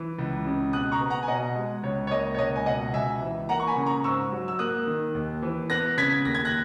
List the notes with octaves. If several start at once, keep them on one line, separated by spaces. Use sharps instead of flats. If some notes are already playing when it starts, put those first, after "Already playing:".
Already playing: E3
C#2
C#3
B2 D#6 F#6
A#5 C#6
B3
F#5 A#5
G#5
B2 D#5 F#5
G#3
C#2 C#5
C#5
A#3 D#5
C#5
C#2 D#5
G#5
B2 D#5 F#5
C#2 E5 G#5
E3
A#3 F#5 A#5
C#6
G#5 B5
C#3
A#5 C#6
G#2 C#6 E6
F#3
E6
A#3 D#6 F#6
D#3
D#2
E3
B3 F#6 A#6
C#3 G#6 B6
D#2 A#6
G#6
F#6 A#6